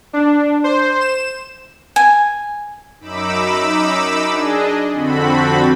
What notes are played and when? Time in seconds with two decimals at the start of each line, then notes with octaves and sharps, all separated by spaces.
0.13 D4
0.64 C5
1.00 E7
1.96 G#5
3.00 F#2 D#4 B5 D6 E6
4.28 D4 G#4 D#5
4.91 F2 D3 C4 F#4 A4 B5